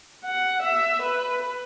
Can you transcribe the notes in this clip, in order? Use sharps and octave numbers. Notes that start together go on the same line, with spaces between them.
F#5
E5
B4